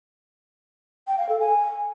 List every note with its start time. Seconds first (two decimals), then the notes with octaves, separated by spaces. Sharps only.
1.07 G5
1.18 F5
1.29 A4
1.40 G#5